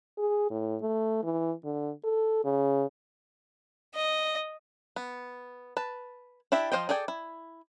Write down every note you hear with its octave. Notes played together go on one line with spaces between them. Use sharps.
G#4
A2
A3
E3
D3
A4
C#3
D#5
B3
B4 A5
D4 E4 G4 E5 G5
F3 D4 C5 D#5 G5
G#4 A4 D5 G5
E4